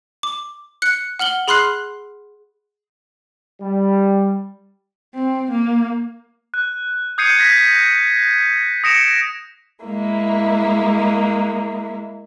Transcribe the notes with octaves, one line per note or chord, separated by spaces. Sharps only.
D6
F#6 C#7
F#5 F6 F#7 G7
G#4 B5 C6 F6 F#6 C7
G3
C4
A#3
F#6
D#6 G6 G#6 C7 C#7 D#7
G#6 A#6 B6
D#6 A#6 C#7 D7 E7
G#3 A#3 E4